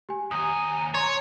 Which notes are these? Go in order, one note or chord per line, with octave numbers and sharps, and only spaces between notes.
G4 G#5
D#2 G#5 A#5 D#6
C#5 C6